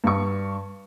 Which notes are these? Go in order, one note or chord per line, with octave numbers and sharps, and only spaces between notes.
G2 C#6